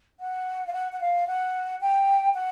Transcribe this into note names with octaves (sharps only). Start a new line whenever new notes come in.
F#5
F5
F#5
F#5
F5
F#5
G5
F#5